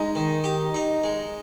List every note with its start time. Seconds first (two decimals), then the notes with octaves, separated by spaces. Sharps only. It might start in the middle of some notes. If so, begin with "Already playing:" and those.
Already playing: G#3 D#4
0.15 D#3
0.44 G4
0.74 D#4
1.04 G#3